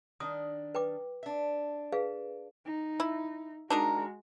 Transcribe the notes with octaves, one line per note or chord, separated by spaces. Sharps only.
D#3 D4 D#6
B4 G5 D6
D4 E5
G#4 B4 F5
D#4
E4
G#3 D4 D#4 F#4 A#4